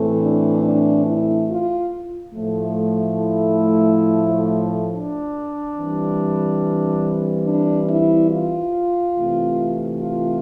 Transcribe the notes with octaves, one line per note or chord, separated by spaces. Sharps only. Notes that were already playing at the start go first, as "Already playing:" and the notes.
Already playing: A2 E3 A3 C4
D4
D4
E4
F4
A2 F3 A3
E4
D4
E3 G3 C4
D4
E4
F4
C3 E3 A3 C4
F4